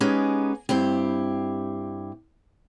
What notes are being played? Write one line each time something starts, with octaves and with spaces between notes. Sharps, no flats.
G#3 B3 C#4 D#4 G4 G#4
G2 C4 E4 G4